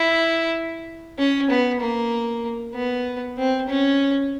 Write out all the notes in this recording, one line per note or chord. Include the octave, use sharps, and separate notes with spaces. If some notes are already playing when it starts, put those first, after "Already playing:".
Already playing: E4
C#4
B3
A#3
B3
C4
C#4